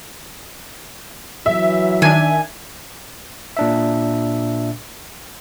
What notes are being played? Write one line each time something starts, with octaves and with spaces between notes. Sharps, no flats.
E3 F#3 E5
D#3 D4 G#5
A#2 D4 E5